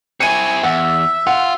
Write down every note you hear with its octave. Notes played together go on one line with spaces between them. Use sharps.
C4 E4 G#5 C#7 D#7
E2 E5 F#5
F4 F#5